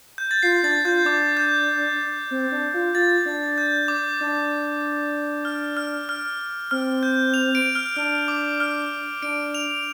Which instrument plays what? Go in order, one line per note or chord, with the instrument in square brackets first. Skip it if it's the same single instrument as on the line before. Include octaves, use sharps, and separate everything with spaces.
[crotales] G6
A6
[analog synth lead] F4 [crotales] C7
[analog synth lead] D4 [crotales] A6
[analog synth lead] F4 [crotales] G6
[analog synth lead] D4 [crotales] D6
[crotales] G6
[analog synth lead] C4
D4
F4
[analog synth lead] F4 [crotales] A6
[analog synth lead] D4
[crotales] G6
D6
[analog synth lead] D4
[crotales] F6
F6
F6
[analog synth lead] C4 [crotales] F6
[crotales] G6
F7
D7
F6
[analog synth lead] D4 [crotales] F6
[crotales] D6
F6
[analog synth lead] D4 [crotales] D7
[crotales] F7